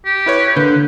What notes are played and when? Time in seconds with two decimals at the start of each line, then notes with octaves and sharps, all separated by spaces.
0.05 G4
0.26 E4 B4 C#5
0.56 D3 A#3 B4 G6